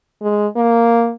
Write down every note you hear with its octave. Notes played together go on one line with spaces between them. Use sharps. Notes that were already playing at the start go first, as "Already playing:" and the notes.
G#3
A#3